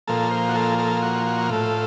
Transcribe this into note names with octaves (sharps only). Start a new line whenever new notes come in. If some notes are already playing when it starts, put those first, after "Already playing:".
A#2 F3 A#3 A4
C5
F#4
A4
A4
F#4
F#4
A2 A3 F4